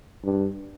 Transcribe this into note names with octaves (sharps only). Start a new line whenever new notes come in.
G2